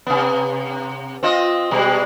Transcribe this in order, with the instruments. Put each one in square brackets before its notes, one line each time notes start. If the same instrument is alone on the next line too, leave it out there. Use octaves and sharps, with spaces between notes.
[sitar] C3 B3
C4 F4 D#5
B2 G3 G#3